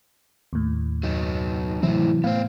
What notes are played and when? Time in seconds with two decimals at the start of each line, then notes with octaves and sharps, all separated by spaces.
0.53 D#2 A2
1.03 F#2 F#3 D#4
1.83 A2 C3 E3 F#3 C4 E4
2.24 A2 B3 C5 F5